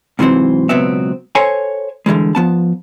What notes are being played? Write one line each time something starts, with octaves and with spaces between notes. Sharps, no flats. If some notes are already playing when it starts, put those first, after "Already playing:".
G#2 C3 E3 F#3 C4 C5
C#2 B2 F#3 B3 C4 E5
A4 C5 C#5 G#5
D3 E3 G3 G#3
F3 B3 A5